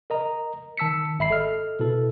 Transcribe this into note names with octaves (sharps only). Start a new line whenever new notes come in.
A#4 D#5 A#5
D#3 A5 E6 B6 C#7
G#1 E5 B5 C7
A4 D#5 F6
B2 E4 A4